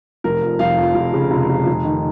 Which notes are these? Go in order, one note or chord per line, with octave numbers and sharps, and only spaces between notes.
F1 A#4
F2
F1 F5
F2
F1
C#3
F1
F1
F1
D#3